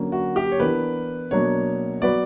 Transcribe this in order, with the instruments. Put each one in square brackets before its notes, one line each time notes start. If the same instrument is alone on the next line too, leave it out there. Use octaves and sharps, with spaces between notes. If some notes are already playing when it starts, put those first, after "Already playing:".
Already playing: [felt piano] D3 F#3 A#3 C#4
[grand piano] F#4
G4
C#5
[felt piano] E3 B3 D4 A#4 [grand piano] B4
[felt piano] B2 F#3 A#3 D4 [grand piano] C#5
[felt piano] F#3 B3 F#4 B4 [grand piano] D5